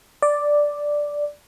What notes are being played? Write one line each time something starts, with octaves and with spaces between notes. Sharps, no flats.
D5